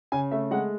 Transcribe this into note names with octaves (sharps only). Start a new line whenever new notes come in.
C#3 G#5
A3 E5
G#3 F#5